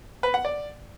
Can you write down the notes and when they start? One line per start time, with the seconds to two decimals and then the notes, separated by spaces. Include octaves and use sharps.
0.23 B4
0.34 F#5
0.45 D5